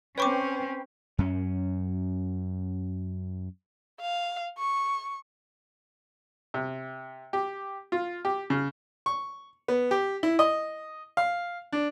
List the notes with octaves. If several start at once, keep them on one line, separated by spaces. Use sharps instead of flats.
C4 C#4 B4 C#5 G5 C#6 D6
F#2 C#4
F5
C#6
C3
G4
F4
G4
C#3
C#6
B3
G4
E4
D#5
F5
D4